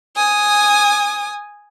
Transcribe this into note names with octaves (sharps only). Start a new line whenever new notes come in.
G#5 D#6